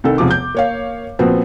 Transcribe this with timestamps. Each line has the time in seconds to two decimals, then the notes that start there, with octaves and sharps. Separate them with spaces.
0.04 C2 D#3 A4
0.18 E1 C3 F3 D6
0.31 G6
0.55 A#3 C#5 F5
1.19 A#2 F3 B3 C4 F#4